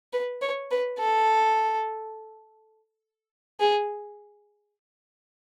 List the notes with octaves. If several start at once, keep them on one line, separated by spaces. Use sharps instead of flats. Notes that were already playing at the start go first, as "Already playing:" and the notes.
B4
C#5
B4
A4
G#4